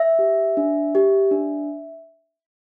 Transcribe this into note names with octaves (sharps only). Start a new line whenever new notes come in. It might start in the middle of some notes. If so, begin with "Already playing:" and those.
Already playing: E5
G4
D4
G4
D4